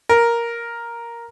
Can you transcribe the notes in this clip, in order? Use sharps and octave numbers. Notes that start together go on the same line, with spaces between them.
A#4